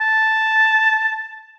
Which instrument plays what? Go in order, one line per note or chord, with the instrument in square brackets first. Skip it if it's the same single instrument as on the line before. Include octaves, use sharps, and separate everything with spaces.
[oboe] A5